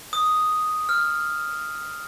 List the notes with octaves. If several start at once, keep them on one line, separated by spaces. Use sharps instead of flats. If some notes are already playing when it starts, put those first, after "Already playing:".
D#6
F6